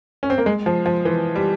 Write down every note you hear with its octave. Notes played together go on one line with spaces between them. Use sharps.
C#4
C4
A#3
G#3
F3
F3
E3
G3